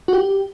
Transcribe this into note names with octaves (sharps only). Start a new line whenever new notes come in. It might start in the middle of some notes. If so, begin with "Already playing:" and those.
F#4
G4